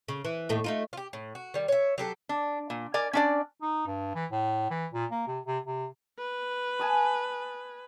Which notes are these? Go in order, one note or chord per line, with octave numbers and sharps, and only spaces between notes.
C#3
E3
D#2 A2 A3
A3 D#4 F4
F4 G4
A2
F#4
D#3 G3
C#5 E5
F#3 G4 A4
D4
A#2
A#4 D5 G#5
C#4 D4 D5
D#4
G2
E3
A2
E3
A#2
A#3
C3
C3
C3
B4
G#5 A5 D#6